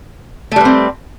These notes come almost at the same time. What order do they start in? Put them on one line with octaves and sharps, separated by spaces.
A3 G3 B4 C4